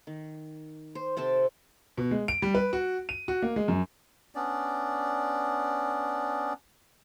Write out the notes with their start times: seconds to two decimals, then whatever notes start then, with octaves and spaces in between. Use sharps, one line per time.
0.07 D#3
0.95 C5
1.17 C3 C4 A4 A5
1.98 B2
2.11 G#3
2.28 D7
2.42 G3
2.55 B4
2.73 F#4
3.09 D#7
3.28 F#4
3.42 A#3
3.56 G#3
3.68 F#2
4.35 B3 C#4 D4 D5